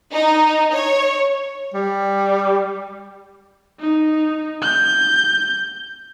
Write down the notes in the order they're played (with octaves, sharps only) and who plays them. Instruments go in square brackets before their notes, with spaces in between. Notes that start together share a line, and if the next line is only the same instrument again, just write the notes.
[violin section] D#4
C#5
[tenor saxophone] G3
[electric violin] D#4
G6